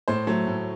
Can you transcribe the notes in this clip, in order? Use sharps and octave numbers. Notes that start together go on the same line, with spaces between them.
A2 C5
F#3 A3
A2